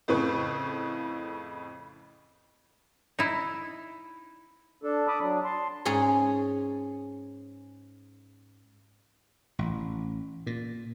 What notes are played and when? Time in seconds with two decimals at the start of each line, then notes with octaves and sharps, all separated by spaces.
0.08 F2 A2 C#3 B4 C#6
3.19 D#4 E4
4.83 D4 A4
5.08 A5 B5 D6 D#6
5.20 F#3 D4
5.44 A5 C6
5.85 G#2 C#4 G#4
9.59 A1
10.47 A#2